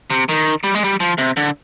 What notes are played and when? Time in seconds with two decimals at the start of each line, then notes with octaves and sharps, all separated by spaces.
0.10 C3
0.29 D#3
0.64 G3
0.75 G#3
0.84 G3
1.00 F3
1.18 C3
1.37 D3